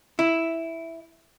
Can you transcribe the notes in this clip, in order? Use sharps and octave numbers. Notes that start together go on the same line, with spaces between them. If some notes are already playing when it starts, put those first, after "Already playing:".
E4